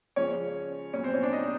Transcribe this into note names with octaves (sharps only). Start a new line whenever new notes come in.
C#3 F3 G#3 C#4 C#5
A#2 F#3 B3 C#4 C#5
C4 C5
C#4 C#5
D4 D5
D#4 D#5